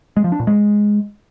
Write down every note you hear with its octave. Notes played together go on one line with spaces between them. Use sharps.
G#3
F3
D4
A#2
G#3